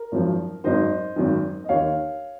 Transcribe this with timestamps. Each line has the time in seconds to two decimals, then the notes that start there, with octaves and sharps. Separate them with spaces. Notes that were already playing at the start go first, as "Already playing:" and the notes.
Already playing: A#4
0.12 G#1 F#2 F3
0.64 G#1 F#2 D#3 C5 D#5
1.16 G#1 F#2 D#3
1.64 D#5
1.69 D#2 D#3 C#5 F5